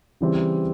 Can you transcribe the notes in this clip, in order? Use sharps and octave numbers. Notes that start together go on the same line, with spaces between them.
C#3 E3 G3 C4